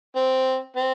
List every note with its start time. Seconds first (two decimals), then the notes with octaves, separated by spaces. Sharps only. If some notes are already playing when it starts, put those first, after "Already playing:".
0.16 C4
0.76 C4